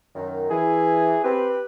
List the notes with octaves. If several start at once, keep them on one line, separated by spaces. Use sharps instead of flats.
F#2 D#3
E3 G#4
C4 G4 B4